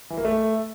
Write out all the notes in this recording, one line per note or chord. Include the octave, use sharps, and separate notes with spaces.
E3
A#3
A3